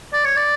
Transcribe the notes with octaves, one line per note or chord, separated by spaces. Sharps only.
D5
C#5
D5